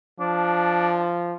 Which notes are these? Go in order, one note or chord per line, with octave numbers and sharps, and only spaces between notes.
F3 D4